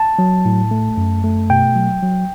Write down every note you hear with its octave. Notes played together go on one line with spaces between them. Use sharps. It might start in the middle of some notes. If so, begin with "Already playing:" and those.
Already playing: A5
F#3
A2
A3
F#2
A3
B2 G5
F#3
F#3